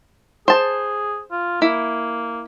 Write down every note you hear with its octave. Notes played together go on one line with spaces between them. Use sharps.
G#4 C5 A5
F4
A#3 E4